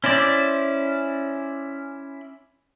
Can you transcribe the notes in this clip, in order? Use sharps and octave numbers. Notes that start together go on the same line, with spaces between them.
C#4 E4 C5 D5